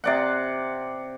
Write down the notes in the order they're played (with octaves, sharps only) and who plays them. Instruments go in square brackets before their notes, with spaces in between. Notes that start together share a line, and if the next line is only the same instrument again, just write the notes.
[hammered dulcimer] C3 D5 F#5